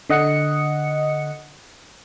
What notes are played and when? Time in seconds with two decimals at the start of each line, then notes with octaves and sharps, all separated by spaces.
0.10 D3 D#5 F#5 C#7